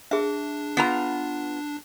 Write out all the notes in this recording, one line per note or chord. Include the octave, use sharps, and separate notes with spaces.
D4 G#4 E5
B3 F4 A#5